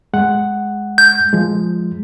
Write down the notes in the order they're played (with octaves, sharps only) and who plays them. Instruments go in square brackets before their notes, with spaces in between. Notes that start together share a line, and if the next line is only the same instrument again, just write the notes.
[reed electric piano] G#3 F#5
[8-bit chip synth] G6
[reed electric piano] F3 G#3